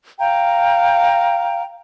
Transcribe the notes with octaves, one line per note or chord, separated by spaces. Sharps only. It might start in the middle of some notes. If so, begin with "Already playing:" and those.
F5 G5 A#5